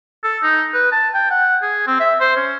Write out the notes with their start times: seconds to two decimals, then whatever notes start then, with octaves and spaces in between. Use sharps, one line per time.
0.24 A4
0.43 D#4
0.74 B4
0.92 A5
1.14 G5
1.30 F#5
1.62 G#4
1.87 C4
2.00 E5
2.20 C5
2.36 C#4